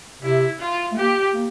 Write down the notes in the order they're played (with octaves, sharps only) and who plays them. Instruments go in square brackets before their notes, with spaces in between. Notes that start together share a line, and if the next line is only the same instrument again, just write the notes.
[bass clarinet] C3 [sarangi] E4
[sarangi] F4
[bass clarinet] A3
[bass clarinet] A#3 [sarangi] G4
[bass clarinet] A#3